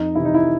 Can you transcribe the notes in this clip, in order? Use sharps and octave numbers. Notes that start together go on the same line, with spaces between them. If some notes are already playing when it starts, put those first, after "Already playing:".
Already playing: F2 D#4
C3 E3 E4
D#4
E4